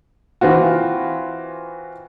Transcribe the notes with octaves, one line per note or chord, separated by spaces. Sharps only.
E3 C4 F4 F#4